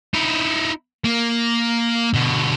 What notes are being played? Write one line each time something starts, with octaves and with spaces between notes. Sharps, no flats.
D#4 E4
A#3
B2 D3